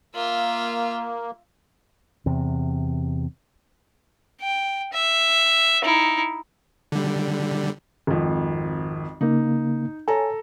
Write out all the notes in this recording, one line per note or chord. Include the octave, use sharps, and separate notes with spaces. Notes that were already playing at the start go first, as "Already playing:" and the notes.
A#3 F4 E5
E2 C3
G5
E5
D#4 E4
D3 G3
G#1 F2
C#3 A#3 D#4
A4 C#5 G#5 A#5